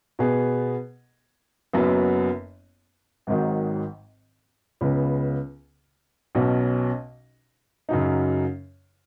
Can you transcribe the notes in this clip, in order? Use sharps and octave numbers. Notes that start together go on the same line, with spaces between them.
B2 B3 G#4
F#1 F#2 F#3 B3
G#1 G#2 D#3 F#3
C#2 C#3 B3
B1 B2 F#3 C#4
F#2 C#3 F#3 D#4